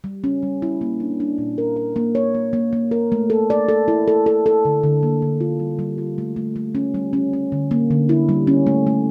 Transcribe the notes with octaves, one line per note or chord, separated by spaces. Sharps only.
G3
C#4
G3
E4
A#3
D4
D4
A#2
A#4
A#4
A#3
C#5
A#3
A#3
A#3
A#4
A3
A4
D5
A4
E4
A4
A4
A4
D3
D3
A#3
D3
F4
G3
G3
F4
A3
A3
A3
C#4
G3
C#4
C#4
D3
A#3
D3
E4
G3
C#4
A3
A3